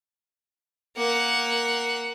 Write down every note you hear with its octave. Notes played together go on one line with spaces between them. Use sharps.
A#3 F#5